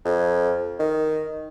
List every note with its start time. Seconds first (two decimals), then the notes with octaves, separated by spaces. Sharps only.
0.05 F2
0.79 D#3